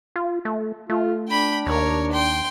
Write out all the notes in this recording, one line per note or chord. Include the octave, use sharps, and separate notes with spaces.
F4
A3
A3 F4
D4 G5 B5
D#2 A#4 C#5
G5 C6